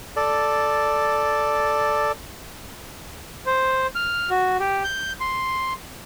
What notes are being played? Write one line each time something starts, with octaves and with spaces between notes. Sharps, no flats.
A4 D5
C5
F6
F#4
G4
G6
C6